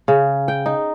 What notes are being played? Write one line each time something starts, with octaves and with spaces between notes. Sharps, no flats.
C#3
G5
D#4